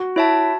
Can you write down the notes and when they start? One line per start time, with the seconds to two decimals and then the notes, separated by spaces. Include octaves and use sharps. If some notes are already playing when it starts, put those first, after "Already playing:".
Already playing: F#4
0.16 E4 C#5 E5 A5